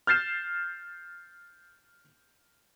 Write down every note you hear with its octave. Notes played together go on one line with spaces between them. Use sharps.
F6 G6 A6 C7 E7